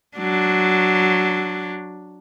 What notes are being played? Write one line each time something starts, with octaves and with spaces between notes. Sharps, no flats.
F#3 D4